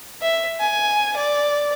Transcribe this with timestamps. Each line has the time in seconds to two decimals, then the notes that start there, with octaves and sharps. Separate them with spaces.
0.22 E5
0.60 G#5
1.16 D5